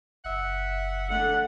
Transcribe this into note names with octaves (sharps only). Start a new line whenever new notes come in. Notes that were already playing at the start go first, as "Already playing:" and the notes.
F#1 E5 F#5
D3 A3 F#5